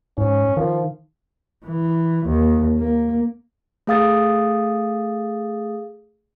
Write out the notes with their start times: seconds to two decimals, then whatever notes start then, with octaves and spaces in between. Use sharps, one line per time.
0.18 G#2 C#4
0.57 D#3 F3
1.65 E3
2.26 D#2
2.79 A#3
3.87 A3 G#4 F5 D#6 A6